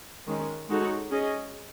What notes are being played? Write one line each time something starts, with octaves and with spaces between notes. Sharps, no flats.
D#3 G#3 C#4
G#3 D#4 F#4 A4 C#5
C#4 G#4 D#5